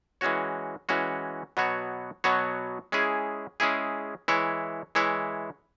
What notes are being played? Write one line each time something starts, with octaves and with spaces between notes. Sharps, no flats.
E3 G#3 C#4 F#4 C#5
E3 G#3 C#4 F#4 C#5
B2 F#3 B3 F#4 C#5
B2 F#3 B3 F#4 C#5
G#3 C#4 E4 G#4
G#3 C#4 E4 G#4
E3 G#3 E4 C#5
E3 G#3 E4 C#5